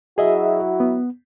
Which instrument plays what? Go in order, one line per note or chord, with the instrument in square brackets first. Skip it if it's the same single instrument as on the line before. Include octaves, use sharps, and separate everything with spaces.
[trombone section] F#3 E4 F#4 [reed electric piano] G#4 D#5 E5
[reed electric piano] B3